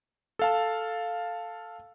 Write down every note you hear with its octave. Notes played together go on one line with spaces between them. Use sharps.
A4 F5 A5